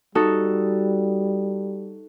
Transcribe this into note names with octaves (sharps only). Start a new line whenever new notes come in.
G3 D#4 F#4 A4